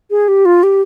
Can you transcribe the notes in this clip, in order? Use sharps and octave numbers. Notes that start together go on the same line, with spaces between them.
G#4
G4
F4
G4